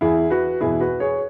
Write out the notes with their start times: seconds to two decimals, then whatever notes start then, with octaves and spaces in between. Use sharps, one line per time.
0.01 E2 E3 E4 G#4
0.30 F#4 B4
0.61 E2 B2 E4 G#4
0.80 F#4 B4
1.00 G#4 C#5